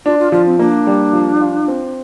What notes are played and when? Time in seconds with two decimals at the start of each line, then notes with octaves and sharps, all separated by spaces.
0.05 D4 F4
0.19 F4
0.32 F3 F4
0.46 C4
0.59 A#3 D4
0.87 G3
1.13 F3
1.41 F4
1.68 C4